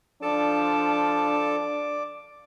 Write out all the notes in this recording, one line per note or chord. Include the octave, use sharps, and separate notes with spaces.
F3 D4 A4 D5 A5 D6